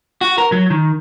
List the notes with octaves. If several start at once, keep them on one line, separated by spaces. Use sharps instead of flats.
F#4
A#4
F#3
D#3